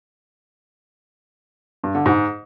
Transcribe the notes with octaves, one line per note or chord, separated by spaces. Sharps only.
G2
D3
G#2